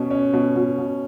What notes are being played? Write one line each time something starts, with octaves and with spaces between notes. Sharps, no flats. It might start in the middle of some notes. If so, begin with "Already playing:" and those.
Already playing: B2 C#4
C#4
B2
B2
B2